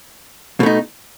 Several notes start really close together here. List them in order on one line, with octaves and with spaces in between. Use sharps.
B2 A3 D#4